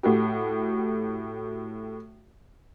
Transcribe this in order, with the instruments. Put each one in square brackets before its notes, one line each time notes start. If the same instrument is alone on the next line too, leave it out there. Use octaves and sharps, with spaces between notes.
[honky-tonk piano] A2 F#4 G4